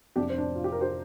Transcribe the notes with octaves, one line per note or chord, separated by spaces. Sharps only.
F1 F2 C3 F3 D4 G4
C4
D4
F4
G4
A#4
G4 C5